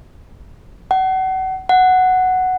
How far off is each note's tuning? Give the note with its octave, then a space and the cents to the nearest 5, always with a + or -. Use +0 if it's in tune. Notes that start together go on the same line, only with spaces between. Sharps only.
F#5 +35
F#5 +0